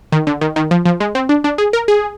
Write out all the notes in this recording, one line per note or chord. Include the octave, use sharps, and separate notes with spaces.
D#3
D3
D#3
D#3
F3
F3
G#3
C4
D4
D4
G#4
A#4
G#4